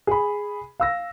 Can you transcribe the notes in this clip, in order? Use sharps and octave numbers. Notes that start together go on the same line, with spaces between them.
G#4 B5
F5 E6 A#6